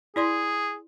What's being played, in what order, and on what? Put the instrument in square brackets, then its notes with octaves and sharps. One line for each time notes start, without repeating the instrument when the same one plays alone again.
[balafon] E4 D5 C6 [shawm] G#4